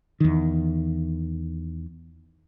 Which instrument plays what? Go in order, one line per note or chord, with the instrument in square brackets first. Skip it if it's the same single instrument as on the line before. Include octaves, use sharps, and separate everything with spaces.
[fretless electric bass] E2 D#3